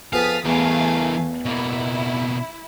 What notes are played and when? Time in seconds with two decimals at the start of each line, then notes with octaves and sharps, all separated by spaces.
0.13 F2 B3 G#4 F5 D#6 A6 B6
0.45 E2 E3 A3 A#4 F5 G#5
1.45 B2 A#3 E4